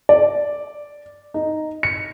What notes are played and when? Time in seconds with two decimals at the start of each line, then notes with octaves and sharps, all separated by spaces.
0.09 D5
1.34 D#4
1.83 C#7